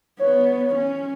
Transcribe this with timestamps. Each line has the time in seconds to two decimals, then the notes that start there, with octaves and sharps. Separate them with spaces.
0.19 B3 C#5
0.75 C#4